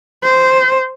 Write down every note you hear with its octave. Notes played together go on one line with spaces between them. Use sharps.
C5